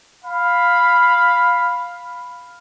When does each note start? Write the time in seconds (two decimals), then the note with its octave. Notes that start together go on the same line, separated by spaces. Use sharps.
0.24 F5 B5